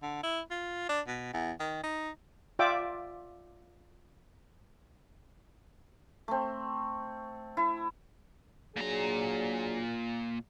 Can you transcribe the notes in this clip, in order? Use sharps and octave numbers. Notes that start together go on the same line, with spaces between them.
D3
E4
F4
D4
B2
E2
D#3
D#4
F4 D5 E5 G5 D6
A3 C4
E4
A#2 F#3 D4 G#4 A#5